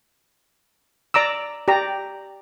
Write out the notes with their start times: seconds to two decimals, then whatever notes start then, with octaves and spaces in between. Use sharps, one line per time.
1.14 D5 A#5 D6 E6
1.68 G4 D5 A#5